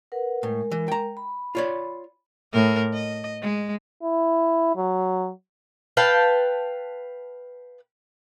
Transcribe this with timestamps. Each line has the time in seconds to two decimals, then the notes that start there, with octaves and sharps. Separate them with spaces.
0.12 A#4 B4 F#5
0.43 A2 G#3 A#4
0.71 E3
0.88 G5 A#5
1.17 B5
1.55 F4 C#5 D5
2.53 A2 A#4
2.93 D#5
3.42 G#3
4.02 E4
4.76 F#3
5.97 B4 F5 G5 A5